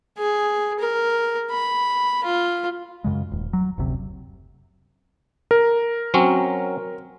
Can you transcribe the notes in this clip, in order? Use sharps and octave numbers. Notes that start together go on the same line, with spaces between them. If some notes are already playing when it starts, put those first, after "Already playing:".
G#4
A#4
B5
F4
F#2 C#3 G#3
D#1
F#3
F#1 D2 C3
A#4
F#3 C4 C#4